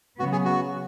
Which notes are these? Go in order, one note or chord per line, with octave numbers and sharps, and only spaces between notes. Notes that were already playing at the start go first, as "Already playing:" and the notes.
C#3 F#3 B3 F#4
G#4
F#4